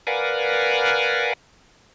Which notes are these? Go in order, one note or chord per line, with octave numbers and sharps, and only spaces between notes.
A#4 B4 D5 F5 F#5 G#5